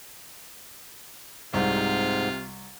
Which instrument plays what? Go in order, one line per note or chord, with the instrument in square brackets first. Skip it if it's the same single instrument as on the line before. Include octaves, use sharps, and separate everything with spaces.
[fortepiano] C2 [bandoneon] G#2 [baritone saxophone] C3 [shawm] F4